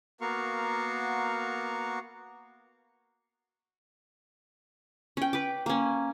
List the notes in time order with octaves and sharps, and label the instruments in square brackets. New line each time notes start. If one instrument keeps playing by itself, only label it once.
[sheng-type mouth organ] A#3 B3 F#4 A#4 F5 C#6
[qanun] C#4 G5
B4 D6
A#3 C#4